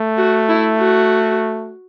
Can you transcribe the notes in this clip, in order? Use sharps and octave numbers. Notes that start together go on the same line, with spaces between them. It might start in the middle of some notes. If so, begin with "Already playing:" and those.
Already playing: A3
F#4
E4
F#4